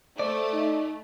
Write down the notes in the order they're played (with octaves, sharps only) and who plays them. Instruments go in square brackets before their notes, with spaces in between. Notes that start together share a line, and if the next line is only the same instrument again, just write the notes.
[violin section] A3 [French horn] C5 [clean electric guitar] D5
[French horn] D#4